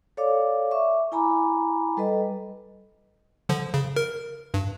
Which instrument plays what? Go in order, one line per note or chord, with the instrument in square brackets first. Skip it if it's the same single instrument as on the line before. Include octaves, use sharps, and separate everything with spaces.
[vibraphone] A4 C#5 D5 F5 D6
E5 C#6 D6
E4 G#5 A#5 B5 D6
G3 A4 B4 D#5
[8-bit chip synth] D3 F3
C#3
A#4
G2